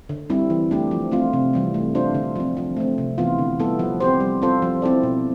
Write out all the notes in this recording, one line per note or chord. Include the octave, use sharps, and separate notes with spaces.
D3
G3 C4 E4
E3
A3 D4 G4
F3
A3 C4 F4
C3
E3 G3 C4
A3
D4 F4 C5
D3
F3 C4
F3
A3 C4
C3
E3 B3 F4
D3
G3 B3 E4 A4
F3
C4 G4 C5
G3
C4 F4 A4 C5
F3
C4 E4 A4 D5
B2